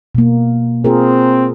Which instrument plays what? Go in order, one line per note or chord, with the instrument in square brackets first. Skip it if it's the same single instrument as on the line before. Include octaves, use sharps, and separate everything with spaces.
[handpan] B2 A#3
[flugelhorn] C4 [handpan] F4 G#4 A#4